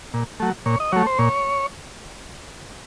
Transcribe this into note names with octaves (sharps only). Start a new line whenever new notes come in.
A#2
F#3 A3
A#2 C#5
D#5
F#3 A3 C#5
C5
A#2 C#5